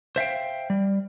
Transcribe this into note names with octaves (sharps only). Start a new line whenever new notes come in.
C5 E5 F5 G5
G3